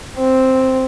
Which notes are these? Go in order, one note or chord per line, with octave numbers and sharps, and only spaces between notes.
C4